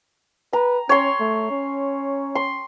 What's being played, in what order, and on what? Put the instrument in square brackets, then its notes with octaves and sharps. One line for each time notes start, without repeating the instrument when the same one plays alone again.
[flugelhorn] B4 [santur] A#5
[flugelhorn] C#4 [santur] C#5 C6
[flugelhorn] A3
C#4
[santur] C6